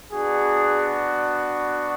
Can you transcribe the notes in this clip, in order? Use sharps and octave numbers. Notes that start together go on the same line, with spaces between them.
B3 D4 F#4 G#4